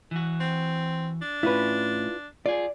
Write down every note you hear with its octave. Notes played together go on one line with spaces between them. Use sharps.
E3 F#4
C4
D4
A2 C#4 E4 F4 B4
F4 G#4 D5